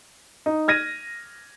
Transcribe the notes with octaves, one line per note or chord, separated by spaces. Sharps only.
D#4
F6 G#6 A#6 D#7